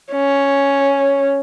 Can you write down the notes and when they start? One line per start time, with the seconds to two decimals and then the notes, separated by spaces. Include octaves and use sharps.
0.11 C#4